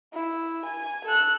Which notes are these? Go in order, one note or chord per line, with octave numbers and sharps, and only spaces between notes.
E4
G#5
A4 F#6